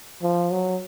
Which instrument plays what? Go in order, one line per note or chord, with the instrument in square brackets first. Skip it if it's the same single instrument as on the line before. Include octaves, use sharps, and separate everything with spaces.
[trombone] F3
F#3